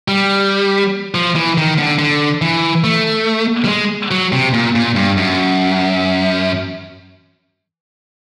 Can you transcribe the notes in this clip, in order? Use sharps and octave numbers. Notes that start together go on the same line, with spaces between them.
G3
F3
E3
D#3
D3
D3
E3
A3
G3
G#3
F#3
C3
A#2
A#2
G2
F#2